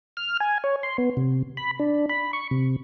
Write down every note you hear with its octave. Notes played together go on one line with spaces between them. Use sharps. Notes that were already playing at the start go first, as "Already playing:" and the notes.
F6
G#5
C#5
C6
B3
C3
B5
D4
B5
C#6
C3